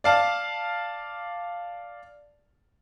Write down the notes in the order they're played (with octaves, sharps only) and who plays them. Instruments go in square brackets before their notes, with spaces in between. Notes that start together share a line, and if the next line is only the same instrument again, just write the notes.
[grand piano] D5 F5 A5